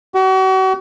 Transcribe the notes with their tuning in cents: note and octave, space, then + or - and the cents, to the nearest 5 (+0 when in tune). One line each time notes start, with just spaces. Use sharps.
F#4 +40